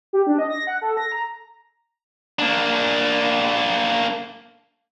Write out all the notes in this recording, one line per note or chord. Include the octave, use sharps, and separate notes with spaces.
G4
D4
D#5
A#6
F#5
A4
A#6
A#5
A#3 D4